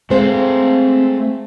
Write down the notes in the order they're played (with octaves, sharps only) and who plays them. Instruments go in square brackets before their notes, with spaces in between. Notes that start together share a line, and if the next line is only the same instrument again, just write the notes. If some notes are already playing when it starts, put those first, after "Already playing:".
[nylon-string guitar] G#3 C5 [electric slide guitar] A3 F5 [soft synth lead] C4